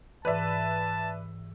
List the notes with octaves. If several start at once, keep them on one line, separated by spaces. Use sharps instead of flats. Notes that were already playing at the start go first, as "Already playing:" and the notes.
G#2 E3 B4 D5 E5 A5